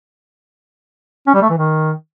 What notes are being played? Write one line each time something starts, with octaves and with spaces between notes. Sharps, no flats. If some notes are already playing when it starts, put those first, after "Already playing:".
C#4
G3
A3
E3
D#3